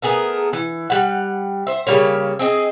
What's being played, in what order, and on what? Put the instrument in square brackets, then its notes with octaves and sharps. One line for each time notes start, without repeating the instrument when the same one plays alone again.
[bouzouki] A3 B3 G#4 A#4
E3
G3 F#5
C5 E5
C#3 G3 A#3 C#5
C4 G#4 D#5